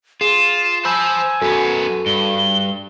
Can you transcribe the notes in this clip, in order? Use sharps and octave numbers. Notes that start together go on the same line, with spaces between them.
F4 G#4 E7
C5 G#5 A5 B5 E6 G6
F#2 B3 F#4 A4
G2 G7